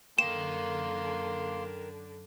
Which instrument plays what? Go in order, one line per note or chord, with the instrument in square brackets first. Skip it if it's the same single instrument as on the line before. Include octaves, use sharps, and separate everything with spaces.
[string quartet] F#2 D3 D4 [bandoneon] A#3 C6 [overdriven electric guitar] A#4 G5 [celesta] E7